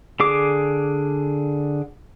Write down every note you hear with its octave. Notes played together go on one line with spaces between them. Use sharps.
D3 G#4 D6